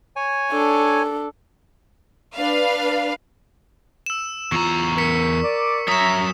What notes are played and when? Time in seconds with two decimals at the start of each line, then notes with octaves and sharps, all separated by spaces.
0.16 C#5 G#5
0.52 D4 A4
2.35 D4 B4 F5
4.06 E6 E7
4.52 E2 F4 A#5 C#6
4.98 A#4 B6 C#7 E7
5.43 D5
5.88 F#2 C#5 E5 A#5 D#6 E7